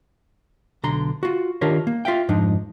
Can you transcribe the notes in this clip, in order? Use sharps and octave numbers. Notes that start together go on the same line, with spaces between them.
B1 D3 A#5 C6
F4 F#4
D#3 D4 F4 G4 A#4 C#5
A#3
F4 E5 F5 G5
F2 G#2 F3 D4 D#4